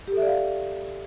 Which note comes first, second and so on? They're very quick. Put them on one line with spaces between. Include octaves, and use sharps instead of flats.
G4 A4 E5 D5 F5